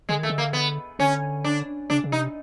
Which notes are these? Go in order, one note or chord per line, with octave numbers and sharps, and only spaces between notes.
D3 G#3
D#3 A3
D3
A#3
B3
D3 C#4
D4
C#3 D4
C#3
C3 D#4